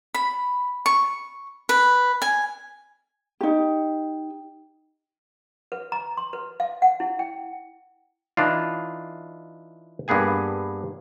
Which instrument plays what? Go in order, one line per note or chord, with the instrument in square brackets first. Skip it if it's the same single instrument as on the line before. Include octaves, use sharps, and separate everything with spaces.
[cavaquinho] B5
C#6
B4
G#5
[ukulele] D#4 G4
[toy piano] B4
A#5
C6
B4
F5
F#5
E4
G5
[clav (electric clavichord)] E3 D4 D#4 F4
G2 A#3 B3 G#4 G#5